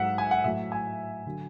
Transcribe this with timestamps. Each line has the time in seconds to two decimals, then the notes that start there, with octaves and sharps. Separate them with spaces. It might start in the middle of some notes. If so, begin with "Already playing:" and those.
Already playing: G#2 F#3 E5 F#5
0.18 G#5
0.31 F#5
0.44 A2 F#3 E5
0.72 G#5
1.26 D3 F#3